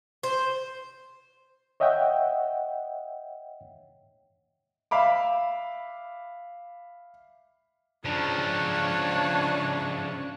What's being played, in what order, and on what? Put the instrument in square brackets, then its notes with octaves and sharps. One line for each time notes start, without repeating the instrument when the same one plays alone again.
[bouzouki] C5
[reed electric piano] C#5 D#5 E5 F#5 G5
[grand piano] E5 F5 B5 D6
[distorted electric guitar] C#3 F3 [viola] D4 C#5